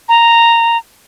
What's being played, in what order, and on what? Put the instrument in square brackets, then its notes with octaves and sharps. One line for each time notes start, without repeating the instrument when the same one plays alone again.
[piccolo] A#5